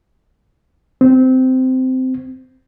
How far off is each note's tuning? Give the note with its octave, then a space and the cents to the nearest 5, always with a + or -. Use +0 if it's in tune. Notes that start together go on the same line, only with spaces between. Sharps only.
C4 -15